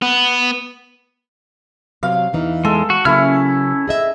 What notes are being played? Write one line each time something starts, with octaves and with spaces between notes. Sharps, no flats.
B3
C3 F#3 F5
E2 E3 D#4
G#3 A4
F#4
C#3 F#3 A#3 C#4 E4 F6
G#4 D#5 E5